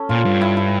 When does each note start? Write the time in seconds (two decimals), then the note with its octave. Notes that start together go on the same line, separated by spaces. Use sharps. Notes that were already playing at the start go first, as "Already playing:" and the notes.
Already playing: C#4 A4
0.09 A#2 F4
0.25 G2
0.41 E4
0.57 E4